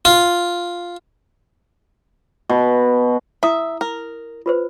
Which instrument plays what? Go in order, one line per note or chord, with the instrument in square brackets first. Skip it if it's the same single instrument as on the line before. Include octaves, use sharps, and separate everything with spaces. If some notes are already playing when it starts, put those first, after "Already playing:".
[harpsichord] F4
[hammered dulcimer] B2
[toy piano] E4 A#5 D#6 [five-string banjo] E5
[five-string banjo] A#4
[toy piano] F4 B4 C5